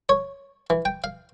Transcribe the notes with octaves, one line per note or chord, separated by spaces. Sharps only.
C#5
E3
G5
F5